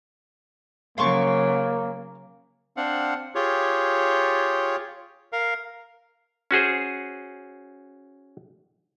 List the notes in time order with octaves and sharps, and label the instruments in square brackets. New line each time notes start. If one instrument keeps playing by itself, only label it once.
[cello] C#3 F#3 [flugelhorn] A#3 [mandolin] F5 C6 C#6
[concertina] C4 D4 F5 F#5
F4 G4 G#4 C#5
A#4 F5
[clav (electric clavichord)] C#4 F#4 G#4 C5